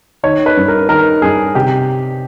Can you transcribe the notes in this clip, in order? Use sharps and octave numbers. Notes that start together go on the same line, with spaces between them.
D#3 C#5
B4
G2
A#4
D#3 A#4
G2 G#4
C3 G4